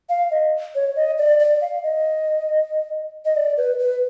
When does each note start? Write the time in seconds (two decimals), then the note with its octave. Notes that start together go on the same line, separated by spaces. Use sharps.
0.09 F5
0.31 D#5
0.75 C#5
0.96 D#5
1.18 D5
1.40 D5
1.61 F5
1.83 D#5
3.25 D#5
3.36 D5
3.57 B4
3.79 B4